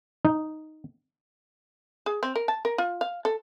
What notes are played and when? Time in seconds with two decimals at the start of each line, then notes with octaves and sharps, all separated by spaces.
0.25 D#4
2.06 G#4
2.23 C4
2.36 A#4
2.48 A5
2.65 A#4
2.78 F4
3.01 F5
3.25 A4